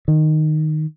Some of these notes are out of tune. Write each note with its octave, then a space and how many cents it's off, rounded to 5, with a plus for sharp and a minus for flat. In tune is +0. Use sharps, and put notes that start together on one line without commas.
D#3 -10